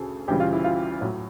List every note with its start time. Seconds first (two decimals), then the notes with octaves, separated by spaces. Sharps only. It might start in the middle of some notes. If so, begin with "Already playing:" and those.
Already playing: D2 C#3 G#4 A4
0.28 D2 C#3 E3 G3 G4
0.40 F4
0.53 E4
0.64 F4
1.01 A2 F#3